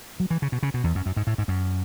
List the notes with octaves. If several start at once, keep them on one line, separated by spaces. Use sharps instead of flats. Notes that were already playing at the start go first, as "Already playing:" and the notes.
F#3
E3
C#3
B2
C#3
B2
E2
F#2
F#2
G#2
A2
G#2
F#2